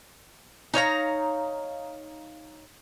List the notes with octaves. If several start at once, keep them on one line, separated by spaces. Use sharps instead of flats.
D#4 C#5 F5 A#5